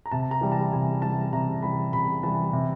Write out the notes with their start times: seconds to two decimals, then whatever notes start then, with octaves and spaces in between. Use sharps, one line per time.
0.06 A#5
0.11 C3 A5
0.31 A#5
0.41 E3 G3
0.52 A5
0.73 C3 G#5
1.02 E3 G3 A5
1.33 C3 A#5
1.62 E3 G3 B5
1.93 C3 B5
2.23 E3 G3 A5
2.53 C3